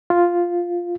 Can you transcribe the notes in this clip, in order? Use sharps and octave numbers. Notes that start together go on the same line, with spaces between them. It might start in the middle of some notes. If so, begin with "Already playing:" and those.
F4